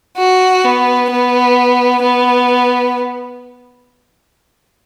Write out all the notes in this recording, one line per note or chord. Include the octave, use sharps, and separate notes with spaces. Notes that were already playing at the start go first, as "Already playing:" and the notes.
F#4
B3
B3
B3